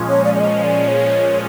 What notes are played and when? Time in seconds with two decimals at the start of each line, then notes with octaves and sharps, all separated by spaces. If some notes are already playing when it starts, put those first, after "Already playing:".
Already playing: A#2 F3 G#3 C#4
0.09 C#5
0.24 D5
0.35 D5
0.40 D#5
0.64 D5
0.88 C#5